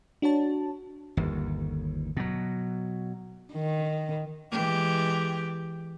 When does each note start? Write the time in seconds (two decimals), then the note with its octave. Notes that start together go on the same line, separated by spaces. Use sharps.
0.22 D4 F#4 C#5 A5
1.17 G1 D#2
2.17 B2 F#3
3.53 D#3
4.51 E3 G#3 G4